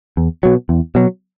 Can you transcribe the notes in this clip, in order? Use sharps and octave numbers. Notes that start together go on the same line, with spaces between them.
E2
B2 F#3
E2
B2 F#3